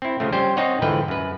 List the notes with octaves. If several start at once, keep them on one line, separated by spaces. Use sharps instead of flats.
C4 E4
C#3 F3 A3
G3 C#4 C5 G5
C4 D#4 C#5 D#5 F#5
G#2 D3 E3 F3 B4 G5
F#2 B4